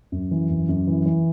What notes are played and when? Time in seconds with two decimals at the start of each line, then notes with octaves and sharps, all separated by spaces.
0.12 F#2
0.31 E3
0.50 F#2
0.69 F#2
0.87 E3
1.06 E3